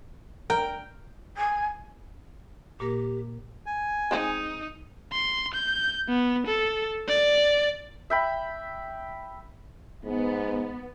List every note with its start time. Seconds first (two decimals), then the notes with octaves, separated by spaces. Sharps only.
0.50 A#4 G5
1.37 G#5
2.80 A#2 A#3 G4 A#4
3.66 G#5
4.11 G#3 C4 D#4 G#4
5.12 C6
5.54 G6
6.09 B3
6.47 A4
7.08 D5
8.10 E5 G5 B5
10.04 G#2 B3